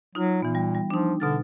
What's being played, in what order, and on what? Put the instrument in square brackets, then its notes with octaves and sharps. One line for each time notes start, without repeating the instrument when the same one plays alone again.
[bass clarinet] F#3 [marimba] D#4 F4
[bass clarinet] A#2 [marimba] E3 B3
[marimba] G3
G3
[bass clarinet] F3 [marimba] D4 D#4
[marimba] B2 F6 A6 [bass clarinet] D3